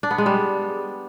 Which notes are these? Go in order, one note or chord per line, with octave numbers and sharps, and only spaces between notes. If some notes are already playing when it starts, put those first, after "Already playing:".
D4
B3
G#3
G3